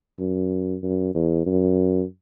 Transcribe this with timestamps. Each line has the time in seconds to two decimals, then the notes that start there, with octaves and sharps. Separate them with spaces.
0.19 F#2
0.83 F#2
1.15 E2
1.46 F#2